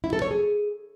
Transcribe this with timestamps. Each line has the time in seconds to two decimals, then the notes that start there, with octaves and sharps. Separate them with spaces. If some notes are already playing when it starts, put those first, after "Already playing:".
0.04 E4
0.13 A4
0.22 C#5
0.31 G#4